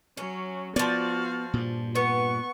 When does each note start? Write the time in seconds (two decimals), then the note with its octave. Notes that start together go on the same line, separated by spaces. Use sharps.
0.17 F#3 C#4
0.76 F3 B3 F#4 D5 F5
1.54 G2 A#2
1.95 B3 C#6